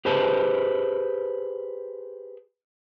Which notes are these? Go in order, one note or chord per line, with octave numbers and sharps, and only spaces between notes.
G4 G#4 B4 C5 A5